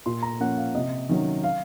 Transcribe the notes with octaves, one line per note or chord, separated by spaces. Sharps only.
A#2 C6
A#5
F3 A#3 C#4 F#5
F5
C3 D#5
D#3 F#3 C#4
F5